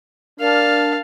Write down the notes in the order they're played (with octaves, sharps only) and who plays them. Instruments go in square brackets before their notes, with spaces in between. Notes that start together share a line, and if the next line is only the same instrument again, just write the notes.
[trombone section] D4 [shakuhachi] A#4 [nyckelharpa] F5 A5